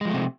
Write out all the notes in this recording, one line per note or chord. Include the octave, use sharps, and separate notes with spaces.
C3 F3 G#3 A3